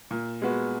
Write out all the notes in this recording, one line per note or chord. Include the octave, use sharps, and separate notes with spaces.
A#2
G#3 B3 F#4